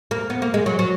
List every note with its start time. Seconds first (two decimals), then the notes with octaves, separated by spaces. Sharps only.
0.11 A#3
0.30 B3
0.42 A#3
0.54 G#3
0.66 F#3
0.79 F#3